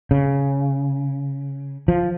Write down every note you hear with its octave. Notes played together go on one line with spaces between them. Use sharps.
C#3
F3